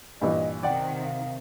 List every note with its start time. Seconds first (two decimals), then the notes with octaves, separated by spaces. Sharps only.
0.21 G2 A#2 E3 D#5
0.63 C3 D#3 D5 F#5 G5
1.03 F5